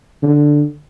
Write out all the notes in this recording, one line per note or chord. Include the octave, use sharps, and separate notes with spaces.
D3